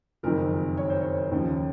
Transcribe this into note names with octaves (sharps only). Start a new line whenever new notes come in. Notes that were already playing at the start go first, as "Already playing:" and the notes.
F#1 F2 D#3 A#4
C#5
C5
C#5
D#2 C#3 F3